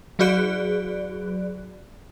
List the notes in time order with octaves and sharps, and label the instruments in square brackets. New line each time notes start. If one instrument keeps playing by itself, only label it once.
[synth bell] F#3 F#4 G#4 D5 F#6 D7